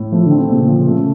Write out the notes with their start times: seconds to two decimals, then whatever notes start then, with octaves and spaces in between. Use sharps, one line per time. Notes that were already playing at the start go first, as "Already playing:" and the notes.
Already playing: A2
0.12 F3 A3
0.26 D3
0.31 C4
0.41 C3
0.49 A#2 C#3
0.67 D3 F3
0.80 C#3
0.87 A3